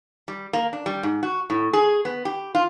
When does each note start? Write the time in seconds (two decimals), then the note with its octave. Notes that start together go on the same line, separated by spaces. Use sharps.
0.28 G3
0.53 A#3
0.73 D4
0.86 G3
1.03 G#2
1.23 F#4
1.50 A2
1.73 G#4
2.05 B3
2.25 G4
2.55 F4